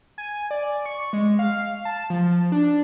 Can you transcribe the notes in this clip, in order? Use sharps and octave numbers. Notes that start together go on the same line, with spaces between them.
G#5
D5
C#6
G#3
F5
A5
F3
D4